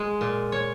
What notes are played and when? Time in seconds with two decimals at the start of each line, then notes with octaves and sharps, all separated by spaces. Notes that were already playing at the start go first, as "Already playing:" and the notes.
Already playing: G#3
0.21 A#2
0.52 C#5